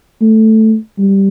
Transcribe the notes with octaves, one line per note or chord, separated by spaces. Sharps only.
A3
G3